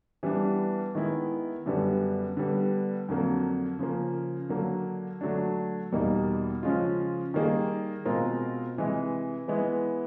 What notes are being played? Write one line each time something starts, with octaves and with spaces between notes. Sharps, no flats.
E3 G3 B3 D4
D#3 G#3 B3 E4
F#2 D3 G3 B3
D3 G3 B3
F2 D3 F#3 A#3
C#3 F3 A#3
D3 F#3 A#3
D3 F#3 A3 D4
E2 B2 G3 A#3 D#4
C#3 F3 G#3 C#4 F4
D#3 G3 A#3 D#4 G#4
B2 G#3 C4 F4 A#4
C3 E3 G#3
E3 G#3 B3 E4